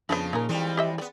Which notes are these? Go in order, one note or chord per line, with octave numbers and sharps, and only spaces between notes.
F2 C#3 F3 B3 D4 D#4 A5
A#2 D#4 G#4 A#4
F2 E3 G3 G#3
G4 D#5 E5
G3 B3 D5